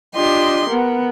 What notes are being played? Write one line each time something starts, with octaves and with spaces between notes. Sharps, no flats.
D4 F4 G4 D#5 C6
B3 A#4 F#5